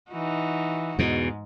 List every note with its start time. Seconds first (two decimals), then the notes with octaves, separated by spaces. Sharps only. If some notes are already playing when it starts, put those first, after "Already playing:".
0.11 E3 D#4 F#4
0.99 E2 G#2 B2